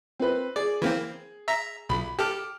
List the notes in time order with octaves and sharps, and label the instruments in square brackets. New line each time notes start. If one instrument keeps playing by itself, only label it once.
[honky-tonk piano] C4 B4
[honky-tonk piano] G#4 [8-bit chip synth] D5
[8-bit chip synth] E3 A#3 C4
E5 A#5
[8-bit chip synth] B1 [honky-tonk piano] B5
[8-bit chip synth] G4 A4 [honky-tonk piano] D6 F6